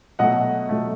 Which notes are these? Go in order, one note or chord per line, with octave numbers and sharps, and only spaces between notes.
B2 F#3 A3 D#5 F#5
B2 F#3 A3